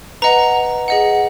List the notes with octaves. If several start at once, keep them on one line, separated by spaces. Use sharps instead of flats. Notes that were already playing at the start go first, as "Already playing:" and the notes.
B4 D#5 F#5 A#5
G#4 D#5 F#5